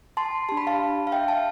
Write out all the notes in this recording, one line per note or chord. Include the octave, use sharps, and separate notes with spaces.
A5 C6
D4 G4 A5
B5
F5 A5
F5
E5 G5
F5 A5